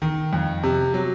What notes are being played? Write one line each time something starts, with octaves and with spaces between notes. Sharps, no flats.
D#3
F2
C3
F#3